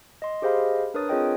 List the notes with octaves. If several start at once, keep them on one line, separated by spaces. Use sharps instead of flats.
D#5 C6
G4 G#4 C5 D#5 F5 B5
D4 A#4 B4 C#5 D#6 A6
C4 F4 G#4 C#5 D#5 G5